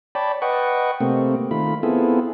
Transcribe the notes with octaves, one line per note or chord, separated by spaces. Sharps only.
C#5 D5 G5 A5 B5
B4 D#5 F#5 G5 C#6
C3 A3 A#3 C4
D#3 A3 F4 B5
B3 C4 E4 F4 G#4 A4